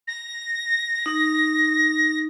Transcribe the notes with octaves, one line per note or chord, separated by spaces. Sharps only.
A#6
D#4